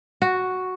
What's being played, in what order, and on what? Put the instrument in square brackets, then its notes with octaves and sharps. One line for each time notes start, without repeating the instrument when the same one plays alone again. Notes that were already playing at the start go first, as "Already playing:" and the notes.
[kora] F#4